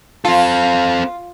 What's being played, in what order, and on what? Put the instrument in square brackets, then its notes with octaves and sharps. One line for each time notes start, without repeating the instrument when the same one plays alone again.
[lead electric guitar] C4 A4 [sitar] F4